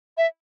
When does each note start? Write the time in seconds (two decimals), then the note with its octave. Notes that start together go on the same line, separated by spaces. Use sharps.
0.17 E5